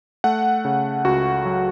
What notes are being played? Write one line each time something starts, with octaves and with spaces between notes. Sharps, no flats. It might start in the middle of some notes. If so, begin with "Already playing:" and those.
A3 F#5
C#3
C#2 F#4
F#3